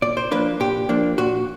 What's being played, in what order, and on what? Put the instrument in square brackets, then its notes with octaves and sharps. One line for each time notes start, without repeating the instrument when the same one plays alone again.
[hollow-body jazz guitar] A#2 D5
C5
F3 A#3 D4 B4
A#2 G4
F3 A#3 D4
A#2 F#4